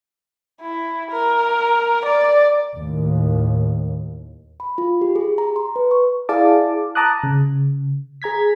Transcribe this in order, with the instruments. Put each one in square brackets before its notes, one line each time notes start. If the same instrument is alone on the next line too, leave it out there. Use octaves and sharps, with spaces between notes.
[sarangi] E4
A#4
D5
[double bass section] D#2 A2
[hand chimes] B5
F4
G4
G#4
A#5
C6
B4
C#6
[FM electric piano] E4 G#4 D5 F5 A5 D6
A5 A#5 D6 D#6 F#6
C#3
G#4 A#5 G#6 B6